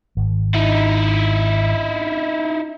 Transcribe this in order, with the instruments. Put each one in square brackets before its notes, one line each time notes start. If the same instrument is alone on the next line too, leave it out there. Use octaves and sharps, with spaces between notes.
[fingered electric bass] G#1
[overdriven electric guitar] D#4 E4